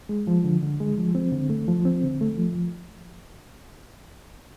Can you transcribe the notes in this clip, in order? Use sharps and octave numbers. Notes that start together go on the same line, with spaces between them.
G#3
F3
D3
D3
G#3
F3
C4
D3
A3
F3
C4
D3
A3
F3